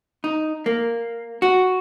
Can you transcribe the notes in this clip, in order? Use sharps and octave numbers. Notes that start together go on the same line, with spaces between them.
D#4
A#3
F#4